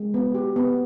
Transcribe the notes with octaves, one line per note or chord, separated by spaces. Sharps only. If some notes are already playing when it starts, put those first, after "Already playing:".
Already playing: G#3
B3
G4
B3